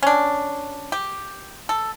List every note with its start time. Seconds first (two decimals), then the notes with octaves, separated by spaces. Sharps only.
0.03 C#4 D4
0.92 G4
1.69 A4